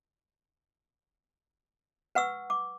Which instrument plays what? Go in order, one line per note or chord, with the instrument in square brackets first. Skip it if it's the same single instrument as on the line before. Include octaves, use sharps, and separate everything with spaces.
[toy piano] B4 F#5 C#6 E6
D6